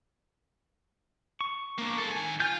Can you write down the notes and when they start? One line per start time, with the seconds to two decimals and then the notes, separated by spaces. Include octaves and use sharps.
1.41 C#6
1.78 A#3 D4
1.98 G#3 A4
2.12 D#3 G#5
2.40 F4 G#5 G6